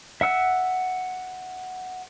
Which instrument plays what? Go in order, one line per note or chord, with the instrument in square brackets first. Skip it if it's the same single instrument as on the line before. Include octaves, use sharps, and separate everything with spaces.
[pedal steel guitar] E5 F#5 E6